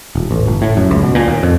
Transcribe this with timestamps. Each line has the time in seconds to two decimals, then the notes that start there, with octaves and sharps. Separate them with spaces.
0.15 D#1
0.31 A1
0.47 G1
0.62 A2
0.77 F#2
0.91 C#2
1.03 B2
1.15 A#2
1.28 D#2
1.43 F2